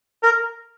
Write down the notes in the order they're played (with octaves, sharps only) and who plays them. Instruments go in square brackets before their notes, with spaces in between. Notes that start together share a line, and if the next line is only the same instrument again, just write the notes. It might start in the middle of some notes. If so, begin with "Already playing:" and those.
[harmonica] A#4